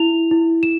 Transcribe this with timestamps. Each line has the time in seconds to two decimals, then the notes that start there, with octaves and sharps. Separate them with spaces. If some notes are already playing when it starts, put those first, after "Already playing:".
Already playing: E4 F7
0.31 E4
0.63 E7